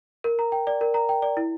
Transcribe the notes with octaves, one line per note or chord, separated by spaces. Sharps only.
A#4
A#5
G5
D5
A#4
A#5
G5
D5
E4